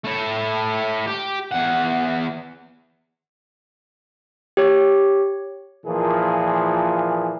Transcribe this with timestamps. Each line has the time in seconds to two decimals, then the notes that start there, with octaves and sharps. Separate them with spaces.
0.04 A3 E4
1.07 G4
1.52 E2 F#5
4.57 G4 C#5
5.86 A#2 E3 F3 A#3 G#4